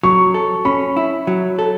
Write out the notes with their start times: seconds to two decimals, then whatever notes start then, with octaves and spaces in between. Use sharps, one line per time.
0.03 F#3 C#6
0.34 A4
0.65 C#4 B5
0.97 E4
1.27 F#3
1.59 A4